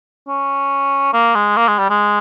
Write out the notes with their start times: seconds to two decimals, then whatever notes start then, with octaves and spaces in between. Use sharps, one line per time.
0.28 C#4
1.13 A#3
1.35 G#3
1.56 A#3
1.68 G#3
1.78 G3
1.90 G#3